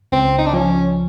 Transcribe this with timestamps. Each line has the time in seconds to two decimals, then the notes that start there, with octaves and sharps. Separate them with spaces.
0.12 C#2 C4
0.38 D#4
0.46 D4
0.53 F3 C#4